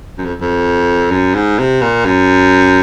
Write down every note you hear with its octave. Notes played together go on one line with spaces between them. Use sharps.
F#2
F2
F2
F#2
G#2
C3
A#2
F#2